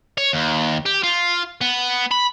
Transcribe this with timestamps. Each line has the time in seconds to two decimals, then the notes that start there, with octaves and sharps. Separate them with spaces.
0.18 C#5
0.33 D#2
0.86 G4
1.03 F4
1.61 B3
2.12 B5